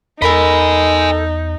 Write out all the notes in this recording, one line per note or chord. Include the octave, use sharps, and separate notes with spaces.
E2 D#4 A4 A#4 D#5 G#5 B5